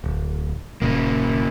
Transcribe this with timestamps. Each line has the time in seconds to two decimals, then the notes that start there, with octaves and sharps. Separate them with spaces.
0.04 D1
0.82 D#1 C#3 A#3